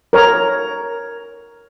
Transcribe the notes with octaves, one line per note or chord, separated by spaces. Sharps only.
A#4 C#5 A#5